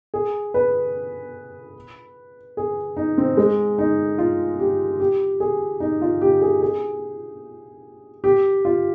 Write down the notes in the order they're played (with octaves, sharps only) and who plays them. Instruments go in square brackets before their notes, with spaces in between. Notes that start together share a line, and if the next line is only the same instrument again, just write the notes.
[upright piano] G#4
B4
G#4
D#4
C4
G#3
D#4
F4
G4
G4
G#4
D#4
F4
G4
G#4
G#4
G4
F4